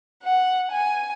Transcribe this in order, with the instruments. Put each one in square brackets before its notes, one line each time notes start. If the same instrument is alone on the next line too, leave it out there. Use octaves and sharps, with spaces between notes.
[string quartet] F#5
G#5